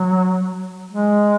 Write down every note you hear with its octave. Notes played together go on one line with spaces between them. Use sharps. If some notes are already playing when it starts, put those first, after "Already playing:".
Already playing: F#3
G#3